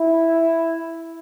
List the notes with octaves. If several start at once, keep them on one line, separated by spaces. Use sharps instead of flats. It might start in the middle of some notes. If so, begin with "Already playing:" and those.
Already playing: E4